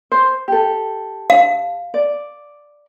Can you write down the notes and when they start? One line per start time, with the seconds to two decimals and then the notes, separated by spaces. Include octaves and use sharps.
0.12 C5
0.48 G4 A4
1.30 F5
1.94 D5